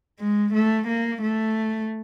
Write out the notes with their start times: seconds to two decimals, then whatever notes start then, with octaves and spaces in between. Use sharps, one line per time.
0.19 G#3
0.54 A3
0.88 A#3
1.22 A3